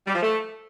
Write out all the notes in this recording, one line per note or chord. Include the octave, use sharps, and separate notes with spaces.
G3
F3
A3